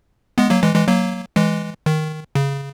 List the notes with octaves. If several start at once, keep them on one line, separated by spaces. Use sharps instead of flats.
G#3 B3
F#3 A#3
E3 G#3
E3 G#3
F#3 A#3
E3 G#3
D#3
C#3